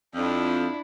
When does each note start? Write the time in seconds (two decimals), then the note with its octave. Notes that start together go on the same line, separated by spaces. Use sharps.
0.15 F2 D4 E4